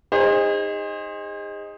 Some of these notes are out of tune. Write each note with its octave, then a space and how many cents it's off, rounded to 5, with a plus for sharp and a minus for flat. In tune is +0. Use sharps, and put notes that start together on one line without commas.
D#4 +0 G#4 -40 C5 +20